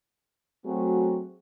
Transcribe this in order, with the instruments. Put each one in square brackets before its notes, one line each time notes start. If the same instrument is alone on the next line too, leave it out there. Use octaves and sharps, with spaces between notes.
[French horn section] F#3 A3 C4 F#4 G#4